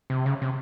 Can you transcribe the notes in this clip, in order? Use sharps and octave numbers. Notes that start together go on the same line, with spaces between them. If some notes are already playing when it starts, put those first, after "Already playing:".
C3
C#3
C3